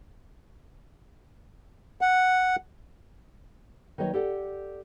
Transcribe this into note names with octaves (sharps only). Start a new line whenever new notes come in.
F#5
D#3 F#3 A#3 B4 C#5 D#5
G4 A4 D5 F#5